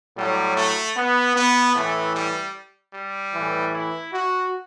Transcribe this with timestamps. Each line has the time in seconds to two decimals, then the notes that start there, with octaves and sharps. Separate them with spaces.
0.17 A2 F#3 G3
0.57 A3
0.97 B3
1.36 B3
1.76 A2 E3 A3
2.15 G3
2.94 G3
3.34 A2 E3
3.74 E4
4.13 F#4